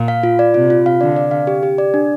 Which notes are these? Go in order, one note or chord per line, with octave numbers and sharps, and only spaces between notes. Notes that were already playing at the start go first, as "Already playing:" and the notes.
Already playing: A#2
F5
F4
D5
C3 F4
F4
F5
D3 D5
D5
F5
G4
G4
D5
D4